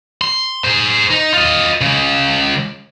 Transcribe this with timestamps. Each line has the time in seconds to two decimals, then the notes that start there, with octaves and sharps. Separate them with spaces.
0.21 C6
0.64 G#4 C5
1.11 D#4
1.34 F4 D#5
1.81 C#3 G#3